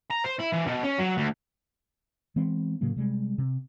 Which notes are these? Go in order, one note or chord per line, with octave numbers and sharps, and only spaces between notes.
A#5
C5
E4
E3
B2
C#4
F#3
D2
E3 G#3 B3 C4
A2 C#3 F#3 A#3
C3 G3 G#3
C3